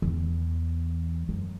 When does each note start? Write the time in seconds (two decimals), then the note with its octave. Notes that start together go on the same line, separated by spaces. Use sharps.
0.02 E2
1.29 F#2